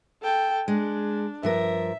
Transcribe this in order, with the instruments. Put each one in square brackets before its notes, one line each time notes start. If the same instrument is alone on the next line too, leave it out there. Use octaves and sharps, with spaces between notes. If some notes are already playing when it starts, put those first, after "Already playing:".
[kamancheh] A4 G5
[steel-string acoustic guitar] G#3 [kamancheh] D4
[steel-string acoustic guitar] G2 F3 A#4 [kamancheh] E5